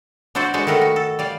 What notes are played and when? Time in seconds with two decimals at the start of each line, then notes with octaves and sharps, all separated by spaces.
0.35 D4 E4 F#4 C5 D5
0.54 G#3 D4 F#4 B4
0.67 D#3 A3 A#4 B4 D#5 F#5
0.81 F#4
0.96 A4
1.19 G3 D5 F5